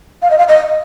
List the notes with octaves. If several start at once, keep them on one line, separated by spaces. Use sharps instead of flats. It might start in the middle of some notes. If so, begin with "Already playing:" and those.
F5
D#5
F5
D#5